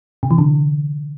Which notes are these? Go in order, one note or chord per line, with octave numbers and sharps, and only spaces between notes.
C3
E3
D3